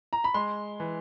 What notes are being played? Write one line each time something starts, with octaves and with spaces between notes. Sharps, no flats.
A#5
B5
G#3 C6
E3